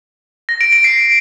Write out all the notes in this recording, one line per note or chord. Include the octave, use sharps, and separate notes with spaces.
A#6
D7
D7
C7